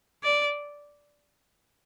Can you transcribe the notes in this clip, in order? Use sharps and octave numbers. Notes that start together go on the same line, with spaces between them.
D5